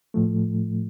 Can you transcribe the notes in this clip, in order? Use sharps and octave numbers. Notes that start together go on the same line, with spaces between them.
A2 F3 A3